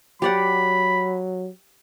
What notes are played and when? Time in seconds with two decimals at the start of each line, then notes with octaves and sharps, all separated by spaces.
0.22 F#3 G4 D5 F#5 B5